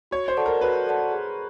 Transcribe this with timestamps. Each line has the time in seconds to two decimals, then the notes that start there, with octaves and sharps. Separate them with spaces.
0.11 F#4 C#5
0.28 C5
0.37 A4 D5 F#5 A5
0.46 A#4
0.61 F#4 B4
0.87 A4 D5 F#5 A5
1.12 G#4